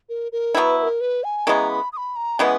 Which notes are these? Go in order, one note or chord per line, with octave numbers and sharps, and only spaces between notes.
A#4
A#4
F#3 B3 E4 B4
B4
A#4
B4
G#5
C#3 E3 G#3 B3 A#5
B5
D#6
B5
A#5
C#3 E3 G#3 B3 F#5 G#5